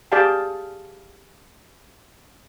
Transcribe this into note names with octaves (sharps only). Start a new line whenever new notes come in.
G4 G#4 D5 F5 G5 A5